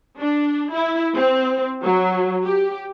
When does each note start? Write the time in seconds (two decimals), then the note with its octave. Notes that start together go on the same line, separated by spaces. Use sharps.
0.19 D4
0.73 E4
1.16 C4
1.83 F#3
2.46 G4